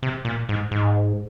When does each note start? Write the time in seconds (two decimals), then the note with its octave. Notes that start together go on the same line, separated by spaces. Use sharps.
0.03 C3
0.25 A#2
0.49 G#2
0.71 G#2